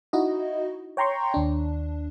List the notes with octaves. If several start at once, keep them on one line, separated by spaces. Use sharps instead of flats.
D#4 E4 F#4 D#5
C#5 G5 A#5 C6 C#6
D#2 D4